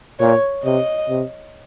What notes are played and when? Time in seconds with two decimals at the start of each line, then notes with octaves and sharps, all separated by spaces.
0.19 A#2 C#5
0.64 C3 D#5
1.09 C3